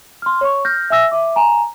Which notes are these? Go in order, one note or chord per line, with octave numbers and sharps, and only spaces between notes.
C6 F6
C#5 C#6
F6 G6 A#6
E5 G#5 E6 A#6
E5 D6
G#5 A#5